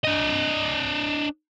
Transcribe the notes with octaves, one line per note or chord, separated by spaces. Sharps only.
D4 D#5